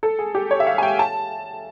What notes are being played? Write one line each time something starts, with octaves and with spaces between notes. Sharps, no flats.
A4
G#4
G4
C#5
E5
F5
G#5
G5
A5